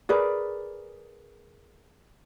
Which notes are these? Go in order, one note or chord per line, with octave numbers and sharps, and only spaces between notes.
G#4 A#4 B4 D5